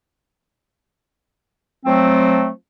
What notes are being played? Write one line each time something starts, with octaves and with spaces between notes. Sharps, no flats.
F3 F#3 A3 C4